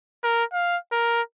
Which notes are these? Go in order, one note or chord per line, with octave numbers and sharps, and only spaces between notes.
A#4
F5
A#4